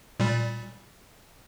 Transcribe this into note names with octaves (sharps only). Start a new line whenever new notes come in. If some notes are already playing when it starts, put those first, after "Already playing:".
A#2 G3